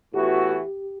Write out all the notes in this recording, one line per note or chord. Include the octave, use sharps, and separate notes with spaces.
A2 E3 B3 F#4 G4